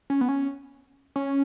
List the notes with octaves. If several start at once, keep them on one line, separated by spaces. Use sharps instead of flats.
C#4
B3
C#4
C#4